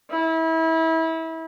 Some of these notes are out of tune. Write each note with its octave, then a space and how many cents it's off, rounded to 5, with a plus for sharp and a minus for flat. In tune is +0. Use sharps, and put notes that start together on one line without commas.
E4 -30